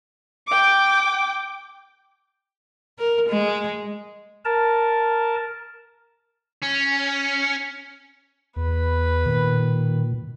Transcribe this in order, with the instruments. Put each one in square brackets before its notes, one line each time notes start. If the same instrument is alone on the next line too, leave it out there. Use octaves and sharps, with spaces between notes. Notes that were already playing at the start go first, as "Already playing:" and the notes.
[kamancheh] G5 D6
[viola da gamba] A#4
G#3
[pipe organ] A#4 A5
[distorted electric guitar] C#4
[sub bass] E2 [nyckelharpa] B4
[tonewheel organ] A#2 [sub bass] D#3